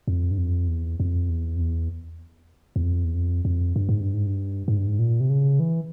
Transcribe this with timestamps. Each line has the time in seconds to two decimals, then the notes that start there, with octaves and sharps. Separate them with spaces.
0.08 F2
0.31 G2
0.38 F2
0.68 E2
1.00 F2
1.29 E2
1.56 F2
1.61 E2
2.76 E2
2.83 F2
3.04 E2
3.15 F2
3.45 F2
3.76 G2
3.89 G#2
4.01 G2
4.14 G#2
4.26 G2
4.68 G#2
4.77 G2
4.87 G#2
4.99 A#2
5.20 C3
5.30 C#3
5.60 E3